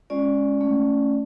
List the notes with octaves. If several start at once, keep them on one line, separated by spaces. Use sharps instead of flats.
G#3 C#4 F4 D5
A3 C#4